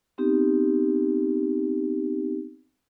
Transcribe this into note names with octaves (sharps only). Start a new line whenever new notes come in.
B3 C4 D#4 G4